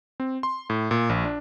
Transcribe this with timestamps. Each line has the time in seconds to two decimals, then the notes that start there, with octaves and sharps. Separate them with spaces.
0.20 C4
0.43 C6
0.70 A2
0.91 A#2
1.09 A#1
1.24 D4